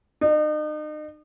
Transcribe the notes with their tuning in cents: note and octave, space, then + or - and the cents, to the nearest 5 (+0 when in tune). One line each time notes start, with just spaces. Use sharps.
D#4 -40